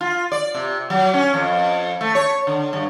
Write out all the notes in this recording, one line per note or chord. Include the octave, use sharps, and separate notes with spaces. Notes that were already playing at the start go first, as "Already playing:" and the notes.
F4
D5
C3
F#3
C#4
F2
A3
C#5
D3
G2